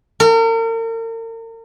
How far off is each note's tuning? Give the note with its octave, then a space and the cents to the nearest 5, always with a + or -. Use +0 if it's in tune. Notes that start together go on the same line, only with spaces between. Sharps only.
A#4 -40